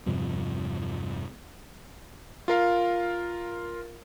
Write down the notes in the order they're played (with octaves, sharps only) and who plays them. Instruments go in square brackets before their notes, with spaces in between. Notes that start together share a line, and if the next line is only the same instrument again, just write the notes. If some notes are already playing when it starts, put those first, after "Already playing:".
[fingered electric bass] E2 G2 C3 F3
[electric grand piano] F4 A#4 F5